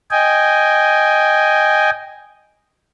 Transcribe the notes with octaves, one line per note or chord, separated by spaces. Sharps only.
D#5 G5 G#5